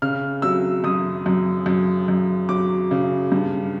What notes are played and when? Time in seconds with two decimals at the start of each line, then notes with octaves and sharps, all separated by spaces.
0.02 C#3 F6
0.42 F#3 E6
0.84 F#2 D#6
1.26 F#2
1.66 F#2
2.08 F#2
2.49 F#3 D6
2.91 C#3
3.32 G2